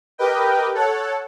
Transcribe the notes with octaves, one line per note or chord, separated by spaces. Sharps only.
G4 A#4 B4 D#5 G5
A4 C#5 F#5